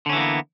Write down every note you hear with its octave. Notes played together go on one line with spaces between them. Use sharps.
D3 E3 A#3 B3 C#4